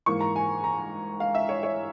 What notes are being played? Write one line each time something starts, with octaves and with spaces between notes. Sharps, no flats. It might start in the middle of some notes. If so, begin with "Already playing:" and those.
G#2 E3 A#3 C#6
A#5
G#5
A#5
F5
E5
C#5
C#5